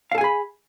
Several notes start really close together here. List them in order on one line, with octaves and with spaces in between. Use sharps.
F5 A4 G#5 G#4 B5